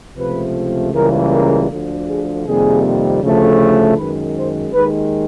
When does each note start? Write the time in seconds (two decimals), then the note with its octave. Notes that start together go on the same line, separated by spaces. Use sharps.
0.18 C#2 C3 F3 A3 B4
0.93 C#2 C#3 E3 G3 A#3 A#4
1.31 A#4
1.69 D2 D3 F3
2.07 G#4
2.45 F2 C3 D#3 G3 A#3 G#4
3.21 D2 C#3 F3 A3
3.97 F#2 D#3 G#3 B4
4.35 C5
4.72 D#2 D#3 G#3 B4